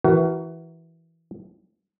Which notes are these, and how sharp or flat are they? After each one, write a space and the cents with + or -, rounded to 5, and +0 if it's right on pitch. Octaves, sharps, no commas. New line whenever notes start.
E3 +0 F#4 +25 A#4 +0